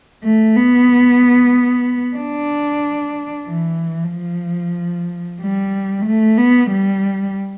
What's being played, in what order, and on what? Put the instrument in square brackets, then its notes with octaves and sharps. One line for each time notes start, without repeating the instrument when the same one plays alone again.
[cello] A3
B3
D4
E3
F3
G3
A3
B3
G3